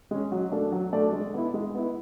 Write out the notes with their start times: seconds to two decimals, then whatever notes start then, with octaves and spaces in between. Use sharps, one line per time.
0.11 G#3 C#4
0.32 F#3
0.52 A3 D4 A4 D5
0.72 F#3
0.92 A3 D4 A4 D5
1.13 G#3
1.34 B3 E4
1.54 G#3
1.75 B3 E4